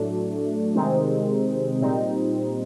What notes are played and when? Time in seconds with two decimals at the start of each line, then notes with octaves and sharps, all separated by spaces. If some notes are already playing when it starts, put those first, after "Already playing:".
Already playing: A2 F#3 A3 D4
0.75 C3 D#3 G#3 C4 D#4
1.81 A#2 G3 C4 D#4